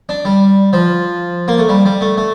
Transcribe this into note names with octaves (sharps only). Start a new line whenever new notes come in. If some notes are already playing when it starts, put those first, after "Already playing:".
D4
G3
F3
A#3
A3
G3
G3
A3
A3